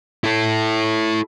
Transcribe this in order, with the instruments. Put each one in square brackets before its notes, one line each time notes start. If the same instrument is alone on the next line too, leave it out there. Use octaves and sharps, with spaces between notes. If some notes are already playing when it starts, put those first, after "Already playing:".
[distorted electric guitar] E4 A4